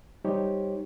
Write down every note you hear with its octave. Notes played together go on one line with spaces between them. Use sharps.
G3 D#4 G4 C5 C#5